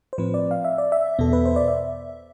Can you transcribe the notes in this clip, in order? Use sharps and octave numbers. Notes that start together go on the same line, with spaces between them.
C5
A2 F3 C4 B4
D5
F5
E5
D5
E5
E2 B2 B3 A4
B4
C5
D5
E5